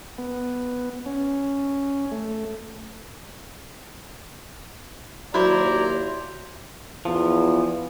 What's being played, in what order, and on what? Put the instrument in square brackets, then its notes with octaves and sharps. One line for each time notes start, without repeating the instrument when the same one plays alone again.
[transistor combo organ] B3
C#4
A3
[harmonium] D#2 D5 A#5 [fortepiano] F#3 [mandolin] E4 C5
[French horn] E2 [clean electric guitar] F3